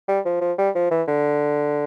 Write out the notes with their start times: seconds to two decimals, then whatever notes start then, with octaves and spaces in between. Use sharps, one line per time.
0.08 G3
0.25 F3
0.41 F3
0.58 G3
0.75 F3
0.91 E3
1.08 D3